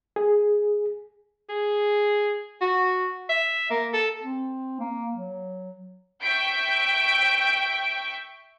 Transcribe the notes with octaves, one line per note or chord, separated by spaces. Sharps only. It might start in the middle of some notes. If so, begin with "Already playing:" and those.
G#4
G#4
F#4
E5
A#3
A4
C4
A#3
F#3
E5 G5 C#6 G6 B6 D7